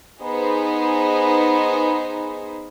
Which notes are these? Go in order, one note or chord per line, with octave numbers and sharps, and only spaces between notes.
B3 D#4 G#4 B4 C5